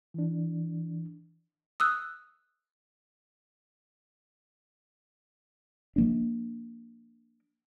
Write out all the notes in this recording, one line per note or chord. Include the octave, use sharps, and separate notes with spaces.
E3 D4
D#6 E6 F#6
F3 A#3 D4